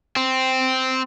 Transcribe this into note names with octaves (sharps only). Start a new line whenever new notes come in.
C4